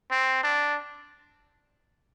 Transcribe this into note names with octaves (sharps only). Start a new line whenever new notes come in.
C4
D4